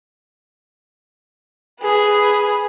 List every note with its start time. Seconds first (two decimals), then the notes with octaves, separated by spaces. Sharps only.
1.81 G#4 B4